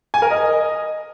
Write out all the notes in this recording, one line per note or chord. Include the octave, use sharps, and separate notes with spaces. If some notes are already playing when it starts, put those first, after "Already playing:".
G#5
A#4
D#5